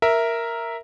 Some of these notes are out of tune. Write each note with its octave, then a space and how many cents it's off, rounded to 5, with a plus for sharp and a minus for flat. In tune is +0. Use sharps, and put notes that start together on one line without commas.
A#4 +0 E5 +0